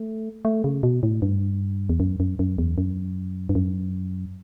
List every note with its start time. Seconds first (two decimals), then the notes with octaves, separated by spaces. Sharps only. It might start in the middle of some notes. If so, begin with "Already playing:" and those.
Already playing: A3
0.45 A3
0.64 C#3
0.83 B2
1.03 A2
1.22 G2
1.89 E2
2.00 F#2
2.20 F#2
2.39 F#2
2.58 E2
2.78 F#2
3.49 G2
3.55 F#2